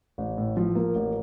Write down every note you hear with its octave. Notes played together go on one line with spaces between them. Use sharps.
A1
A2
F3
A#3
A1